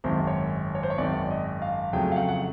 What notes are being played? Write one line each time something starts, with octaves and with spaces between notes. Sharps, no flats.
G#1 F#2 D#3 C5
C#5
C#5
C5
C#5
G#1 F#2 D#3 D5
D#5
F5
F2 C#3 F#3 A3 G5
F5
F#5
F#5